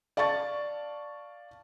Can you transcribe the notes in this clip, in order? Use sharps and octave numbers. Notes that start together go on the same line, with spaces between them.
D5 F5 A5 C#6 A6